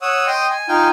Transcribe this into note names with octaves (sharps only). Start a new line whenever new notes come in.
C#5 F#5 D#6 E6
D#5 G5 C6 D#6
G#5
D#4 F4 G5 G#5